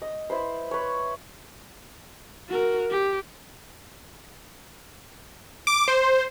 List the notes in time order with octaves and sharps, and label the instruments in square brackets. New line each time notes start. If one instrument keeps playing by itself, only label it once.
[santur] D#5
E4 B4 C5
B4 C#5
[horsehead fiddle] F#4 A#4
G4
[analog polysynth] D6
C5